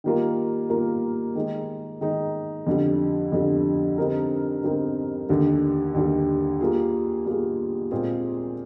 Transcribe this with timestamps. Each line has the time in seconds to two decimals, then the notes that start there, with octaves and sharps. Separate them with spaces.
0.04 D#3 G3 A#3 F4 A#4
0.70 D#3 G3 A#3 F4 A#4
1.35 D#3 G#3 D#4
2.01 D#3 G#3 D#4
2.67 F2 D3 G3
3.32 F2 D3 G3
3.98 D3 G3 C4 D#4 A#4
4.63 D3 G3 C4 D#4 A#4
5.29 D#2 D3 G3
5.94 D#2 D3 G3
6.61 G3 A#3 F4 G#4
7.26 G3 A#3 F4 G#4
7.91 A#2 G#3 C4 F4 G#4